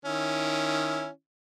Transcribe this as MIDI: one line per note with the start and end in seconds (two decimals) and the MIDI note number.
0.05 1.08 51
0.05 1.08 61
0.05 1.08 64